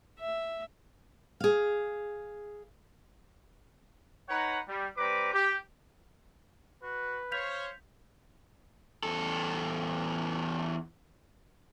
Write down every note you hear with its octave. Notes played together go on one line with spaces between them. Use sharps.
E5
G#4 F5
D#4 B4 C#5 F#5 A#5
G3
G3 C4 B4 A#5 D6
G4
F#4 B4
C5 C#5 F5 G6 B6 F7
E2 A4